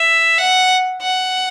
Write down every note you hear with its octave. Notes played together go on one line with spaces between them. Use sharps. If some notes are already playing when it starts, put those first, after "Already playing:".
Already playing: E5
F#5
F#5